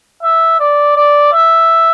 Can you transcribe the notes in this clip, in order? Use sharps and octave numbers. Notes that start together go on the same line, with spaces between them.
E5
D5
D5
E5